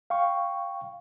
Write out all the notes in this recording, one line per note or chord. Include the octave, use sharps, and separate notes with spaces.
F5 G5 C#6